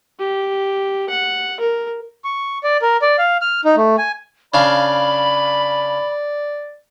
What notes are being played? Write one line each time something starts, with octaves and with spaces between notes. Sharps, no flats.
G4
F#5
A#4
C#6
D5
A#4
D5
F5
F6
D#4
A3
G#5
C#3 D4 D5 F5 B5